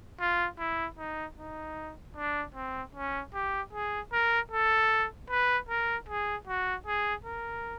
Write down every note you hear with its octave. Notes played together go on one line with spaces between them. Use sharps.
F4
E4
D#4
D#4
D4
C4
C#4
G4
G#4
A#4
A4
B4
A#4
G#4
F#4
G#4
A#4